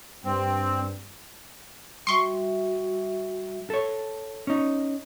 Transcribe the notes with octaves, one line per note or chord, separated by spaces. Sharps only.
G2 C4
G3 F#4 E5 C6 C#6
A4 C#5
C#4 D#4